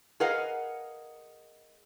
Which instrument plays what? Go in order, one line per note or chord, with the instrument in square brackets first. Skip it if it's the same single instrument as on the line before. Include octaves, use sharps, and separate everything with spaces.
[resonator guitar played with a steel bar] G#4 A#4 B4 D#5 F5 F#5